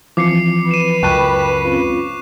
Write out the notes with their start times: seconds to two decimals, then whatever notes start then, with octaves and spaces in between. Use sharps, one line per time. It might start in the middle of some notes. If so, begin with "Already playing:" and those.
0.17 E3 F3 C4 D6 C7 C#7
0.71 B4 D#7 E7
1.03 C#2 F#2 G5 A5 B5 C#6 F#6 D#7
1.65 C4 C#4 F4